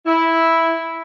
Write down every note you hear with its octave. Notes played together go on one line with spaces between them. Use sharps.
E4